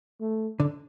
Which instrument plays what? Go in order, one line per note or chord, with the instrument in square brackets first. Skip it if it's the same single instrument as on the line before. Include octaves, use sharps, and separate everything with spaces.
[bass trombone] A3
[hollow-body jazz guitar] D3